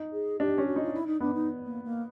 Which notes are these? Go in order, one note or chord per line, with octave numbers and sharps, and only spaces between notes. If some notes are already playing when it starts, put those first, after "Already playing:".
Already playing: D#4
G#4
D4 G4
C#4
F#4
D#4
F4
E4
D#4
B3 D4
D#4
A#3
A#3